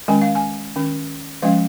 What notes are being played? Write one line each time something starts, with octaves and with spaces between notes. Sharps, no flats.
D#3 G#3 C#4 G#5
F5
G#5
D#3 C#4
F3 G#3 C#4 F5